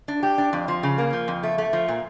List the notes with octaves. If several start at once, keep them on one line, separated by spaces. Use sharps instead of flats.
D4
G4
D4
F2
F3
C#3
A#3
F3
F2
A3
A3
F3
A#2